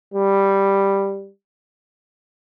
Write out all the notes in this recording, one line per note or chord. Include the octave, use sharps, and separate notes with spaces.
G3